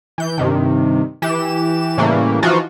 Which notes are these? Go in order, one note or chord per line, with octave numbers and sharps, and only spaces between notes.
E3 G6
G2 C3 D#3
E3 G4 E7
A2 C#3 E3 G3 A3 A#3
E3 F3 D#4 F4 F#4